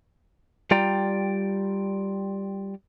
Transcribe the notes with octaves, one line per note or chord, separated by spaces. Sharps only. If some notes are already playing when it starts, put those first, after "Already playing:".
G3 F4 D5 G5 A#5